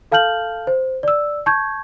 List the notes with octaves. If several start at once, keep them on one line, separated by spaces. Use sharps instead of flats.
A4 F5 A5 F6 G6 F#7
C5
D5 E6
A5 C#6 G6 G#6